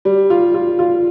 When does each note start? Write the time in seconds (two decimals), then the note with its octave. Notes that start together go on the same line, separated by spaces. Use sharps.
0.05 G3
0.30 F4
0.54 F4
0.79 F4